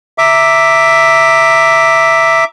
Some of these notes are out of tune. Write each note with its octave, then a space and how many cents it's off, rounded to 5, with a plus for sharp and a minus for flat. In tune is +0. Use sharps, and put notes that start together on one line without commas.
E5 +0 A#5 -5 D6 +0